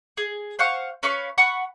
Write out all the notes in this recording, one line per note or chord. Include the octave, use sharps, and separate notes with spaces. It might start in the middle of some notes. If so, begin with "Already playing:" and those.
G#4
C5 F5 F#5 C#6
C#4 B4 F5 C#6
F#5 B5 C#6